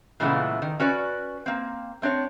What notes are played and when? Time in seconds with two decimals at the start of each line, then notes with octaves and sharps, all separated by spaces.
0.20 A#2 C#3 E3 G#3 A3 B3
0.62 D#3
0.80 C#4 F#4 B4 D5 G#5
1.46 A#3 C4
2.02 A3 C4 D4 C#5